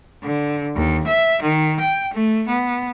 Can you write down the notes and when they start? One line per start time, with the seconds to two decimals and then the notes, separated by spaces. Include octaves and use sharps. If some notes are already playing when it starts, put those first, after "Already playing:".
0.24 D3
0.76 D#2
1.07 E5
1.43 D#3
1.80 G5
2.13 A3
2.48 B3